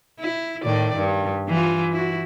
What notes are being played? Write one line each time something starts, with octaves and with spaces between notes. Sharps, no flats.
E4
A2 D#3 D5
G2
E3 F4
E4 F#4